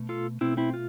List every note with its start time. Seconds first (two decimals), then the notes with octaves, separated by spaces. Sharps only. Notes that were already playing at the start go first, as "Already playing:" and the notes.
Already playing: B2 A3
0.09 F4 A4
0.41 B2 A3 C4 E4
0.57 C4 E4
0.74 F4